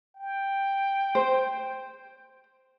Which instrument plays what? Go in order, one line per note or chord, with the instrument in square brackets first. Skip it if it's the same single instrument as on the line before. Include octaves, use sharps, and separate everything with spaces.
[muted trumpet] G5
[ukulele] C5